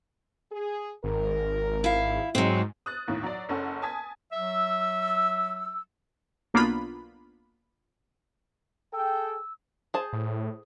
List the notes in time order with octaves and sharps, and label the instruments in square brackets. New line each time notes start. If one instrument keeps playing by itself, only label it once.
[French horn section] G#4
[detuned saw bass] G#1 [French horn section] A#4
[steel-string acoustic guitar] E4 F5
[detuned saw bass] G#2 [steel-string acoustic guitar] F#3 C4 [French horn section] G#3
[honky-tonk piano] D#6 F#6 A6
D#2 A2 D#3
F#3 D5
F#1 C#4 A4 F#5
G#5 A5 D#6 G#6 B6
[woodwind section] F#3 E5 E6
[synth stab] B1 A#3 B3 D4 F4 B5
[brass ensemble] G#4 A4 G5 [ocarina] E6
[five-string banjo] G#4 C5 A5
[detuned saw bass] A2